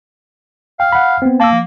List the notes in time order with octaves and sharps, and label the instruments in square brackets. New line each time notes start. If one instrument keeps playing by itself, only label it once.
[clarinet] F5 [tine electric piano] G5
[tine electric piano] F#5 B5
B3 C4
[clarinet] A#3 [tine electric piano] A5 E6
[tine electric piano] F3